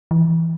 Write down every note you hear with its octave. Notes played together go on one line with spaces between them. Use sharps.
E3